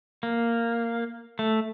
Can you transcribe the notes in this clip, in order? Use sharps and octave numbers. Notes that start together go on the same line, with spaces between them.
A#3
A3